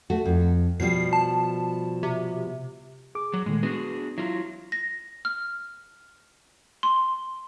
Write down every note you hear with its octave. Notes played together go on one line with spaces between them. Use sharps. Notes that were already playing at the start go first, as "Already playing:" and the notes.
A3 F#4
F2
B2 F3 G3 C7
A5
C3
G#4 D6
F#3
A#2 D#3 G#3 A3
B3 D4 F#4 G#4
F#3 E4 F4
A#6
F6
C6